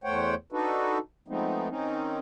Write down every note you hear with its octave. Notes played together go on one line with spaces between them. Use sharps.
E2 A3 C5 C#5 F#5 G5
D4 D#4 F#4 A4 B4
F3 G#3 A3 B3 C4 D#4
D#3 C4 C#4 D#4